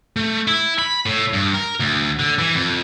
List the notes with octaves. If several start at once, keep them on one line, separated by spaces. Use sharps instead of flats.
A3
E4
B5
A2
G2
A#4
D2
D3
E3
F2